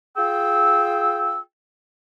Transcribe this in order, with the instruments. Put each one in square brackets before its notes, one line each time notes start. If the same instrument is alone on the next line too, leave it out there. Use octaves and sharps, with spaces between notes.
[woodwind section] F4 G#4 G5 E6